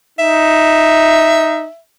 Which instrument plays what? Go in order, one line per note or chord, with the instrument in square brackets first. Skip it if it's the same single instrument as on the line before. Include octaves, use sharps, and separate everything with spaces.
[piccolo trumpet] D#4 [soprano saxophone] E5